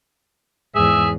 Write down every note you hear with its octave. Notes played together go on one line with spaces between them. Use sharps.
E2 G#2 G#4 E5